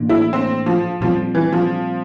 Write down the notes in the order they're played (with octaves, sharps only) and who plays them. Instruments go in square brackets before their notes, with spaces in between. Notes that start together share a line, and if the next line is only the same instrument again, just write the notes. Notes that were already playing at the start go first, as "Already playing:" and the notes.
Already playing: [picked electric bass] A2 E3 A#3 D4
[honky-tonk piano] E4
C4
F3
[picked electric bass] A#2 G3 C4 [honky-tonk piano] F3
[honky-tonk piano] E3
F3